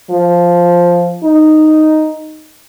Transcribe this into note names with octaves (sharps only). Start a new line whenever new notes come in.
F3
D#4